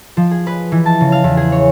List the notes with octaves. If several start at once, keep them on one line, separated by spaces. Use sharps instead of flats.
F3
G#4
B4
E3
A5
C#3
F5
E2
G#4
C#5